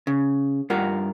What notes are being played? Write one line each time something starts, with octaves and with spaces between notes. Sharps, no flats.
C#3
G2 F4 A#4 F#5